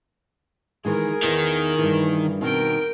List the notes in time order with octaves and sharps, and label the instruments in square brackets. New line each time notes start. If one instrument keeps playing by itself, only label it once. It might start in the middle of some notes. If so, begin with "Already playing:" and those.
[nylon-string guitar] D#3 E3 G#3 [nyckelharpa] G#4 A#4
[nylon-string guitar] E2 E3 [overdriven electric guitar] D#3
[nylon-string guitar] G2 E3
[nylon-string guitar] B2 D#3 C4 [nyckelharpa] A#4 G5